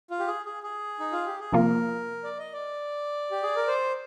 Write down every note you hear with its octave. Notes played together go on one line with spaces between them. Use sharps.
F4
G4
G#4
G#4
G#4
D#4
F4
G4
G#4
C3 F3 A#3 F4 A#4
D5
D#5
D5
G4
G#4
A#4
C5